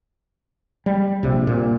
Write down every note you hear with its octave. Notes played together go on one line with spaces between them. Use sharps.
G3
A#1 C3
A#2